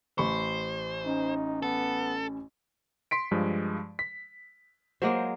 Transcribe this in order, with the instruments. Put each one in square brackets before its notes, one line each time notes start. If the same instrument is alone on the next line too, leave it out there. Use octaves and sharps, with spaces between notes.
[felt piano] A1 B5 C#6 [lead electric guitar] C5
[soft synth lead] C#4 [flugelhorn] D#4
[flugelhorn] B3 [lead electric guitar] A4
[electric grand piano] C6 B6 D7
G2 F3 G#3
B6
[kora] F#3 G#3 A#3 [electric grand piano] C5